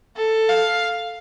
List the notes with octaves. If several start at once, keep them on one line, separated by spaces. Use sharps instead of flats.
A4
F5